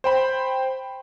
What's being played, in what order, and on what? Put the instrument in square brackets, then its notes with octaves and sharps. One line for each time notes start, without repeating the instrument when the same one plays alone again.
[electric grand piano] C5 G5 B5